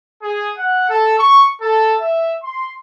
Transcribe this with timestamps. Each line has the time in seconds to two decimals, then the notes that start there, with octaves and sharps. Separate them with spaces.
0.23 G#4
0.58 F#5
0.89 A4
1.18 C#6
1.61 A4
2.00 E5
2.42 C6